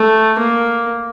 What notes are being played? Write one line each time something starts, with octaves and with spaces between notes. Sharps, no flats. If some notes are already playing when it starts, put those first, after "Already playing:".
Already playing: A3
A#3